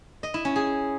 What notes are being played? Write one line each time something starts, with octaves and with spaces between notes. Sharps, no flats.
D#5
E4
C#4
G#4